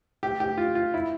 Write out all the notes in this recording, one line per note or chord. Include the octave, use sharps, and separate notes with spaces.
G4
G4
F4
F4
E4